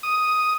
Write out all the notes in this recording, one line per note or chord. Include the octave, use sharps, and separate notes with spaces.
D#6